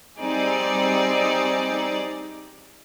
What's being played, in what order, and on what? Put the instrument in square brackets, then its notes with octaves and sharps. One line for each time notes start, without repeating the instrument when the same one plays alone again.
[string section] G3 C4 D#4 G#4 D5